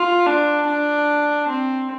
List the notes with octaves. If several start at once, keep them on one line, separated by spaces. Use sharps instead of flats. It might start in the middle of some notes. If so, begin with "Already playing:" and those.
Already playing: F4
D4
D4
C4